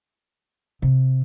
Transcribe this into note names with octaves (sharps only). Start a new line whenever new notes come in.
C3